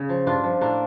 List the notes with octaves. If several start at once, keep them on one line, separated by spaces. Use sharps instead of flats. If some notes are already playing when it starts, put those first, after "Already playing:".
Already playing: C#3
F3
G2 D4 F4
F3
A2 A#3 D4